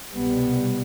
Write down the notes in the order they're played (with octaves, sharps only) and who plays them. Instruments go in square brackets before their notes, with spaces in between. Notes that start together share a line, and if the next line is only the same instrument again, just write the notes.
[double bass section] C2 B2 G3 B3